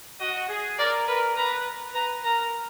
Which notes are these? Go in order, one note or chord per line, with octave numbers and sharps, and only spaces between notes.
F#4 D#5
G#4
A#4 D5
A#4 B4
B4 A#5
B4 A#5
A#4 A#5